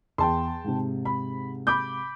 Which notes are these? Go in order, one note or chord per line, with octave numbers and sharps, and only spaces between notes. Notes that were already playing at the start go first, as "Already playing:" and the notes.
E2 G5 A5 C6
G#2 C3
B5
B5 D6 G6